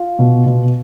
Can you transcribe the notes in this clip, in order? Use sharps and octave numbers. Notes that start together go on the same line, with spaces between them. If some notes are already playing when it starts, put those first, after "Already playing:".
Already playing: F4
B2
B2